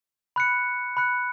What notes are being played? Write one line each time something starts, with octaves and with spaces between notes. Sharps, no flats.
B5 F#6 C#7
B5 F#6 C#7